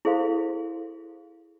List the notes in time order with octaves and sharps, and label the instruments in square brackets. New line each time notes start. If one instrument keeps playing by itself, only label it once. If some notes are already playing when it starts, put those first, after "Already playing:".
[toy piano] E4 G#4 A4 C5 F5 C6